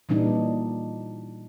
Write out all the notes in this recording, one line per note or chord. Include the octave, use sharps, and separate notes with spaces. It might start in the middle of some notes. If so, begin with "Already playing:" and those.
A#2 E3 G3 D4 D#4